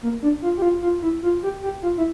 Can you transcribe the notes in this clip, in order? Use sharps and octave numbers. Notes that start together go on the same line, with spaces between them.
A#3
D4
F4
G4
F4
F4
E4
F4
G4
G4
F4
E4